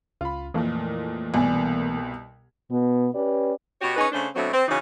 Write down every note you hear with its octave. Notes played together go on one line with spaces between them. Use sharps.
C#2 F4 B5
F2 A#2 E3 A3 A#3
C2 B2 D5 G#5
B2 B3
C#4 G4 B4 D5
B2 F#4 G4 C#5
C#4 D#4 G#4 B4 D#5
C#3 A3 C#4 D4 C5
B2 F#3 A3 C4 D4
C4
C#3 E3 C#4 D#4 F#4